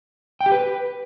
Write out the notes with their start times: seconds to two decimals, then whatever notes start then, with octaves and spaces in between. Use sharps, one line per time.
0.41 G5
0.46 G4
0.52 B4